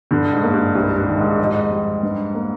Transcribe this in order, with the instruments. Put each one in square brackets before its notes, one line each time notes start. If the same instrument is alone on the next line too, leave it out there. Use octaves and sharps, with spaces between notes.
[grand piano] G2 [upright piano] D3
[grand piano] G#2
[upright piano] A#3
[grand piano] G2
[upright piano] C2 [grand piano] G2
[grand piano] G2
[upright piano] D#3
[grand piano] G#2
[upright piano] F2 [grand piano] G#2
[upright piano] G3
G2
A#3